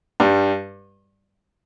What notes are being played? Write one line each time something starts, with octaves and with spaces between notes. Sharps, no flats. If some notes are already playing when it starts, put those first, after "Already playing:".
G2 G3